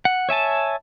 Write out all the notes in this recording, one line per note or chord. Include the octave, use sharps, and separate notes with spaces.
F#5
C#5 E5 G#5 A5